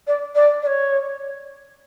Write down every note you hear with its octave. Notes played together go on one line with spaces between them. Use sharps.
D5
D5
D5
C#5